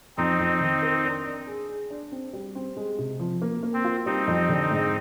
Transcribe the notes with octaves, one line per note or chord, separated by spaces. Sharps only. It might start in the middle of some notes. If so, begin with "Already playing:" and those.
F2 C4 D#4
F2
D#3
A#4
D4
D4
G#4
G#4
D4
C4
G3
C4
G#3
C3
F3
A#3
A#3
C4
F4
G3 C4 D#4
F2
D3
G#2